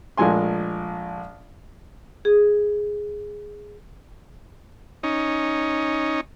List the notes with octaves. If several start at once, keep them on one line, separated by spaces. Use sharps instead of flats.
A#1 A#2 G#3 A3 G#5 C6
G#4
C#4 D#4